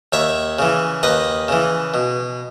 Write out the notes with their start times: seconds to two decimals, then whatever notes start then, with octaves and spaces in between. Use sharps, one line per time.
0.13 D#2 C#5 E5
0.59 C#3 E3
1.03 D#2 B4 D#5
1.48 C#3 E3
1.94 B2